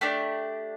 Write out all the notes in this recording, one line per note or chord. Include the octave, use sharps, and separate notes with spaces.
A3 D4 G4 D5